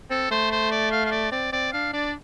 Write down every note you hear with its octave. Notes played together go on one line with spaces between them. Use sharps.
C4 A4
A3 C5
C5
D5
F5
F5
D5
C4 D5
C4 D5
D4 F5
D4 D5